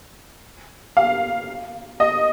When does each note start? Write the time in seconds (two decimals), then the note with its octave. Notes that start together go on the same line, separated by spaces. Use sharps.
0.97 F5
2.00 D#5